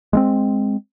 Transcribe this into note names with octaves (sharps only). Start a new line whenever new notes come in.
G#3 A3 C4